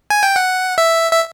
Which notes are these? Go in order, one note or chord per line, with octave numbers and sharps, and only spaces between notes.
G#5
G5
F#5
E5
E5